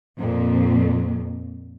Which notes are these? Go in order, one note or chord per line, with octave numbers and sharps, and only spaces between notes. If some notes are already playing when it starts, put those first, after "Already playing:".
F2 A#2